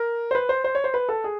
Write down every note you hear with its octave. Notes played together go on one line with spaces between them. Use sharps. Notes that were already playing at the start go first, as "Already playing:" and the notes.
Already playing: A#4
C5
B4
C5
C5
C#5
C5
B4
A4
G#4